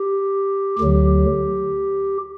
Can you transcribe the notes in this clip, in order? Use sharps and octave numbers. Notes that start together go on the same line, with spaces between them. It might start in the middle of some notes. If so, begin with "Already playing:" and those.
Already playing: G4
D2 D3 F#3 G4